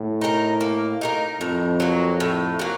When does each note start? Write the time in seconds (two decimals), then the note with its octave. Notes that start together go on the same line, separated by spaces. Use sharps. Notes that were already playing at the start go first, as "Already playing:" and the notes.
Already playing: A2
0.21 D#4 G4 A#4
0.61 A#3
1.01 D#4 G4 A#4
1.40 F2 A2
1.80 F#3 A#3
2.20 A2
2.59 F#3 A#3